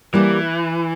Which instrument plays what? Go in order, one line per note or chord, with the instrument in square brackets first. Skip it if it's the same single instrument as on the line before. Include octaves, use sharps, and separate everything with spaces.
[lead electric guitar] E3 [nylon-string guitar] G3 A#3 E4 G4 D5